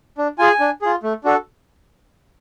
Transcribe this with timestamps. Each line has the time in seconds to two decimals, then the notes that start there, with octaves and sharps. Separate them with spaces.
0.18 D4
0.39 F4 G#4 G#5
0.60 D4
0.82 F4 G#4
1.03 A3
1.24 D4 F#4 A4